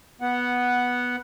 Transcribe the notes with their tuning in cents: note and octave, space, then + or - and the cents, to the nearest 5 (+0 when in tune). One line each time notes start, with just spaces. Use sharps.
B3 -5 F#5 +0